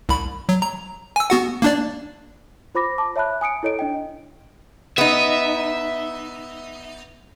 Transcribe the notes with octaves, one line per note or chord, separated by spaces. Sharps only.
C2 B5
F#3
A#5
G#5 E6
B3 F#4 F#5
A#3 D4 D5
F4 C5 B5 D6 A#6
A5 D6
C#5 E5 A5 B5 F#6
G#5 D#6 C#7 D7
E4 A4 C#5 D#5 D7
D4 D#5 G5
B3 D#4 E5